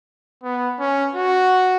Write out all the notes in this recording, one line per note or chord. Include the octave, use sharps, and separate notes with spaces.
B3
C#4
F#4